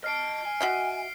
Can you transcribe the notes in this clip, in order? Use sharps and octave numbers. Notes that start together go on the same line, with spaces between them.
D#5 A5 F6 C7 D7
G#5
F#4 D#5 E5 C7